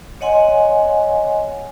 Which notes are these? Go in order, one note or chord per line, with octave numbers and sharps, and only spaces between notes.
C#5 D#5 F#5 G#5 C6